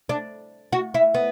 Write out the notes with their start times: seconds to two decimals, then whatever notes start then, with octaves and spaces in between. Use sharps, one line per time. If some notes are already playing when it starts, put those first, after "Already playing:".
0.09 D4
0.72 F#4
0.94 E4
1.14 B3